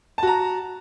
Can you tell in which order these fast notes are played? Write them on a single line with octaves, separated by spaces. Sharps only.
A5 F#4 A#5